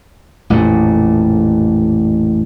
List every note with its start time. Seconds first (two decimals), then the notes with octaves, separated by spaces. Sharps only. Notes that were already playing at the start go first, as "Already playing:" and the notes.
0.50 A1 F2 A#2